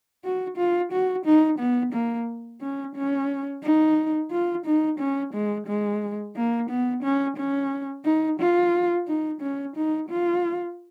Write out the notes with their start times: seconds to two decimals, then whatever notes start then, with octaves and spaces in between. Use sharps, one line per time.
0.24 F#4
0.57 F4
0.92 F#4
1.26 D#4
1.59 B3
1.93 A#3
2.61 C#4
2.95 C#4
3.63 D#4
4.31 F4
4.66 D#4
4.99 C#4
5.33 G#3
5.67 G#3
6.36 A#3
6.70 B3
7.03 C#4
7.37 C#4
8.05 D#4
8.40 F4
9.07 D#4
9.41 C#4
9.76 D#4
10.09 F4